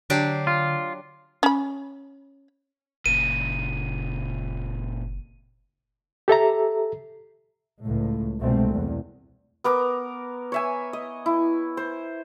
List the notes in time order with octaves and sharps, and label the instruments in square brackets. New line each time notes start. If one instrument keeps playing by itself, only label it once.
[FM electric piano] D3 C7 [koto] F#3 D4 G4
[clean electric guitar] F4
[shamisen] C#4 B5
[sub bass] F#1 [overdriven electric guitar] A#2 C#3 [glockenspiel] D#7
[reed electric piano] G4 A4 E5 A#5
[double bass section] C#2 A2
G1 C2 B2 G#3 A3 C4
E2 B2
[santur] B3 A#4 D6
C#5 E5 G#5
D#5
E4
C5